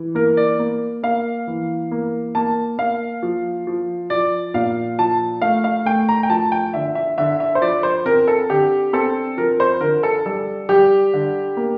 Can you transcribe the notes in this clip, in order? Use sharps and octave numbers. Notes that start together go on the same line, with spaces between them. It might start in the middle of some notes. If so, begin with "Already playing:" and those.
Already playing: E3
A#3 A#4
D5
A#3
A#3 F5
E3
A#3
A#3 A5
A#3 F5
F3
F3
F3 D5
A#2 F5
F3 A5
A3 F5
F5
A3 G5
A#5
G5
F3 A5
G5
D3 E5
E5
D3 E5
E5
C5
F3 D5
C5
C4 A#4
A4
D3 G4
C4 A4
F3 A#4
C5
D3 A#4
A4
G3 A4
G3 G4
D3
A#3